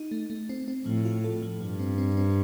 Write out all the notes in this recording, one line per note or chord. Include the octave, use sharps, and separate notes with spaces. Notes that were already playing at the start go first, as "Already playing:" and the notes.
Already playing: D#4
A3
A3
C4
C4
A2 F3
F4
A4
F3
G2 F3
C4
C4
C4